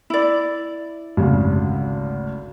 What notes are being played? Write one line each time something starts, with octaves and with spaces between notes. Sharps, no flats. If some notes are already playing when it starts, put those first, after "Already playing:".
E4 D5
G#1 D2 C#3